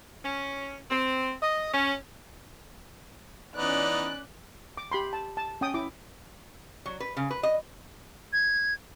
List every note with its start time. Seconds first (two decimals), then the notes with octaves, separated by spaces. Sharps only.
0.24 C#4
0.89 C4
1.42 D#5
1.73 C#4
3.56 E3 B3 C#4 D#4 D5 F#6
4.77 D6
4.92 G4 B5 C6
5.13 A5
5.37 A5
5.61 C#4 G5 D#6
5.74 E4 D6
6.86 F#3
7.00 B4
7.17 C#3
7.31 B4
7.43 D#5
8.33 G#6